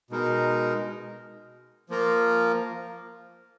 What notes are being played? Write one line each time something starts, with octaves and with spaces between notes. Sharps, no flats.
B2 G#3 D#4 A#4
F3 A#3 F4 A#4